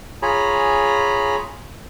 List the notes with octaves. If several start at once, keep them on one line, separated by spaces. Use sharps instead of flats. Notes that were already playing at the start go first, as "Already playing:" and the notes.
F4 G#4 C#5 G#5 A#5 B5